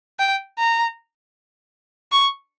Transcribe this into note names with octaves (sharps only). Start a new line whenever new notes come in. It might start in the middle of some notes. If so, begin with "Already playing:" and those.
G5
A#5
C#6